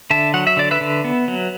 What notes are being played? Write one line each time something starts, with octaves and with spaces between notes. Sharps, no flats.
D3 E5 A5
F#3 F#5
E5
D3 D5
B4 E5
D3
B3
F#3